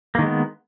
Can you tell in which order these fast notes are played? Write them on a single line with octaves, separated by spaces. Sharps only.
A#3 D#3 G#3 B3